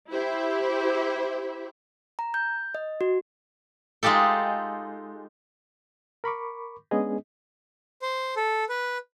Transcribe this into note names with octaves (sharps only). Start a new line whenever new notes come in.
E4 G4 C5 E5
A#5
G6
D#5
F#4
G#3 D#4 F4 G4 A4
A#4 B5 C#6 D6
G#3 B3 C#4 D4 G#4 D#5
C5
A4
B4